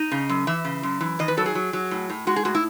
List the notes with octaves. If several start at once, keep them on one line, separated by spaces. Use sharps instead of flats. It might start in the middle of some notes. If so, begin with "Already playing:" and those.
Already playing: D#4 D#5
C#3
F#2
E3 E5
C#3
F#2
E3
D#3 D#5
B4
F#3 A4
G#4
F#3
F#3
A2
A2
G#3 F#4
G#4
A2 F#4
E4